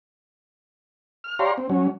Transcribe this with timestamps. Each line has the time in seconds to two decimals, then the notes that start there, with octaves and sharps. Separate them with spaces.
1.24 F6
1.39 G4 C#5 D5 F5 A#5 C6
1.58 C4
1.69 F#3 C#4